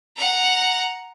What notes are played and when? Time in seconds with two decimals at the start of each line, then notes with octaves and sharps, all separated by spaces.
0.16 F#5 A#5